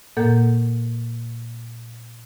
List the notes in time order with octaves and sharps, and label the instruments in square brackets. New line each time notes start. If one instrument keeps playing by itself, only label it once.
[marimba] A#2 A#3 A4 F#5 G6